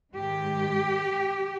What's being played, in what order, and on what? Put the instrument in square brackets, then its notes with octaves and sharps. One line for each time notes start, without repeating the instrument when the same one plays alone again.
[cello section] G#2 D#3 G#3 G4